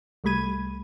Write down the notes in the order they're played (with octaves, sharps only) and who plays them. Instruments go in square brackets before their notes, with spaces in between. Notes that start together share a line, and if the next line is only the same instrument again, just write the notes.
[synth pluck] C2 G3 A3 B5 G#6 D#7